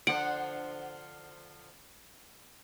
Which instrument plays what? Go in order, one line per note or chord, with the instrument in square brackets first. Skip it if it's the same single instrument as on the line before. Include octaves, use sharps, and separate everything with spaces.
[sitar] D3 F3 C5 [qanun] F#5 [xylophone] D7